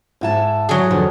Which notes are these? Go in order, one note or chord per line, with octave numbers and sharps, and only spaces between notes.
G#2 E4 A5
F#3 G#4
E2 D3 F3